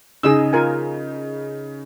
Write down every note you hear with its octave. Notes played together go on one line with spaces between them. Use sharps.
C#3 D#4 G#4 D#5 E6
F4 A#4 G#5